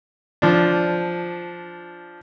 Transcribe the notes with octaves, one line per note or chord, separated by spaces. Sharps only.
F3 D4